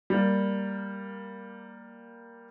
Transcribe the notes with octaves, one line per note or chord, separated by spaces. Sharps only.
G3 A#3